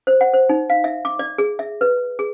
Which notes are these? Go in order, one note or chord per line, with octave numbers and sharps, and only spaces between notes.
C5
F#5
C5
D#4
F5
E5
D6
D5
G#4
E5
B4
G#4